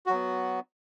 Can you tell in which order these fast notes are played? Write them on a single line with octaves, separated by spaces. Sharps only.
F#4 F#3 B3